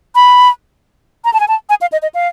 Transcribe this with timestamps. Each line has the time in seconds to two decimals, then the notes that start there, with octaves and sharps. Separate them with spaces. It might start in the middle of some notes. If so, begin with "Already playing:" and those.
0.15 B5
1.25 A#5
1.33 A5
1.40 G#5
1.48 A5
1.69 G#5
1.81 F5
1.92 D#5
2.02 D#5
2.14 F5